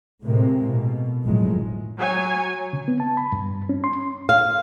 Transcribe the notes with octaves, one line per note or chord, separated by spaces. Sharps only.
A2 C3 G#3 A#3
B2
G1 F2 A2 D#3 F#3 G#3
F#3 C#5 G#5
C#3
B3
A5
B5
G2
C#4
C6
F5